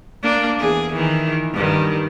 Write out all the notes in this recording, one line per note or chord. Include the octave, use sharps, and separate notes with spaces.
A#3 D4
E2 G#4
D#3 E3
G2 D#3